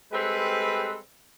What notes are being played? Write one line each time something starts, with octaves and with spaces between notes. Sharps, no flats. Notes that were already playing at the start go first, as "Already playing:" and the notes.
G3 G#3 C4 A4 B4